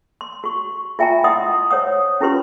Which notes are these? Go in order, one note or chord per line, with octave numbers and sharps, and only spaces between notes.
C6
F#4 C#6
F4 E5 G5 G#5 A#5
E4 D#5 F#5 C6 D#6
C5 C#5 F#5 D#6
C#4 E4 F4 G4 B4 C6